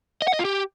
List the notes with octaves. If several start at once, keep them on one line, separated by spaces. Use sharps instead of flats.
D#5
F#5
D#5
F4
G4